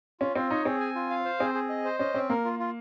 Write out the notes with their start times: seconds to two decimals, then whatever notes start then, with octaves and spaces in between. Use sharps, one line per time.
0.20 C#4 F4
0.35 C4 F4
0.50 D#4 C#5
0.65 C4 G#4
0.80 G#5
0.95 F4
1.10 F5
1.25 C5
1.40 C4 G#4
1.54 G#4
1.69 D#5
1.85 C5
1.99 C#4 D#5
2.14 C4 C#4
2.30 A#3 A#4
2.45 F4
2.59 F4